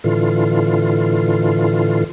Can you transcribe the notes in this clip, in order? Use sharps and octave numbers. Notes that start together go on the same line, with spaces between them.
A2 D3 E3 F4